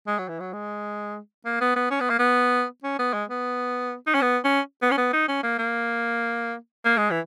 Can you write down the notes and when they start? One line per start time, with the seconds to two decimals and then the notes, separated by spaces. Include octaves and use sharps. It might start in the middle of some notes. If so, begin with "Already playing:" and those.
0.07 G#3
0.19 F#3
0.29 E3
0.40 F#3
0.53 G#3
1.46 A#3
1.61 B3
1.76 B3
1.91 C#4
2.00 B3
2.10 A#3
2.19 B3
2.84 C#4
2.99 B3
3.14 G#3
3.30 B3
4.07 D#4
4.14 C#4
4.22 B3
4.44 C#4
4.82 B3
4.91 C#4
4.97 B3
5.13 D#4
5.28 C#4
5.43 A#3
5.59 A#3
6.85 A#3
6.97 G#3
7.11 E3